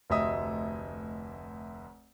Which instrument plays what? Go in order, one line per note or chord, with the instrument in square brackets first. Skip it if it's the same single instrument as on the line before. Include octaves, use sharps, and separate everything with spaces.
[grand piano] F1 D2 D#5 E5 D#6